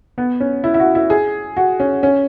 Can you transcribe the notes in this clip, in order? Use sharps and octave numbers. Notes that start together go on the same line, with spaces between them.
B3
C#4
E4
E4
F#4
E4
G#4
F#4
C#4
C#4